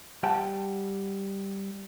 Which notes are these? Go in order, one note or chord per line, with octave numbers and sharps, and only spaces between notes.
G3 F#5 G5 A5